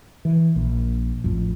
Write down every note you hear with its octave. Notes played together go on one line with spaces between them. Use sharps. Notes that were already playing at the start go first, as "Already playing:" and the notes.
E3
A#1
A1 F2